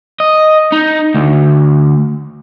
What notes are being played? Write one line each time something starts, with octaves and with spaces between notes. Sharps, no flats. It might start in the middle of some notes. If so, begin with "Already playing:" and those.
D#5
D#4
D2